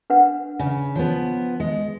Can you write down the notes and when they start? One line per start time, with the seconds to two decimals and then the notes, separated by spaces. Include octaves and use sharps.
0.10 D4 B4 F#5
0.59 C#3
0.96 F3 B3 C#5
1.60 G#3